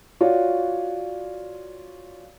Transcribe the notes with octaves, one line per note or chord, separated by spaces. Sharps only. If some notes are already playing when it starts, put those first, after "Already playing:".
F4 F#4 C#5 D5